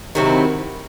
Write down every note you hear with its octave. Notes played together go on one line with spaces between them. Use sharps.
C3 D#3 F#3 C4 E4